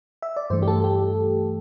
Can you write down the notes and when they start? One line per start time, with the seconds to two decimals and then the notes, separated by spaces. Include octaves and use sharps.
0.22 E5
0.36 D5
0.50 G2 E3 A3 C5
0.62 G4
0.68 A4
0.84 G4